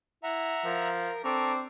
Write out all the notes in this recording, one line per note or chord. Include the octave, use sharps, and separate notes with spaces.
E4 E5 F#5 A#5
F3 A#4
C4 D4 A4 A#5 C#6